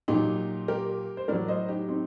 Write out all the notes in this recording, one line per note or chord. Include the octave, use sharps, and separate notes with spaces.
A#2 F#3 D#4 G4
G4 A#4
C5
A2 F#3 A#4 D5
C5 D#5
D#4 G4
C4 D#4